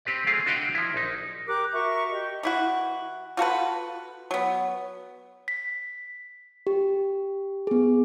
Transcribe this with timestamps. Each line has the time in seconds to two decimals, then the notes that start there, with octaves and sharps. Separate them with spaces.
0.05 C4 G4 B4 D5
0.26 A3 C4 F4 G#4 F5
0.46 D4 F#4 B4 D#5 F5 G5
0.75 F3 E4
0.94 A#1 D#4
1.47 G4 A#4 D6 F#6
1.72 F#4 A#4 E5 C#6
2.10 G4 D#5
2.43 E3 E4 F#4
3.37 F4 F#4 A4 B4
4.31 F#3 B3
5.48 B6
6.67 G4
7.67 B3 G#4